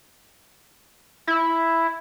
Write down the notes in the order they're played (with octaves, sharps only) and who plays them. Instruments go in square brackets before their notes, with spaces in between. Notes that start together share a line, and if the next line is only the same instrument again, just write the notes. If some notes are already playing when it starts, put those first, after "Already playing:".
[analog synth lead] E4